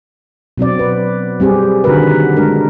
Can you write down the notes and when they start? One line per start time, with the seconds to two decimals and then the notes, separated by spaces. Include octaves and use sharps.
0.58 B2 F#3 C4 D5
0.79 B4
1.40 G3 C4 G4 G#4
1.84 D3 D#3 F#4 G#4 A#4 B4
2.36 G#3 D4 A#4